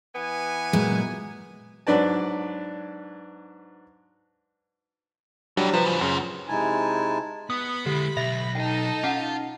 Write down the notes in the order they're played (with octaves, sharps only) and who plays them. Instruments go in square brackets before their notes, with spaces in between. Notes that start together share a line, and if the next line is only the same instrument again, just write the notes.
[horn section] E3 B3 G#5
[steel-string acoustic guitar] A#2 F#3 G#3
[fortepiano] G#2 F#3 D4 B4 D5 A5
[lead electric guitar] E3 G4 [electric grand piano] F#3 G3 D4
[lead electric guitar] C3 [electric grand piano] F3 B4
[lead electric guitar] A2 C#3
[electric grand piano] F#2 C#3 [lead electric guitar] F#4 C5
[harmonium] C3 G#3 D#4 E4 G#5 A5
[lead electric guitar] B3 [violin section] B5 [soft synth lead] D#6
[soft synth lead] D3 [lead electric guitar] G#3 E4 [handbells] G4
[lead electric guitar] B1 [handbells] E5 [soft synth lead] A#6
[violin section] D#4 A4 A5 [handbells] G5
[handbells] C#4 F#5 [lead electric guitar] F4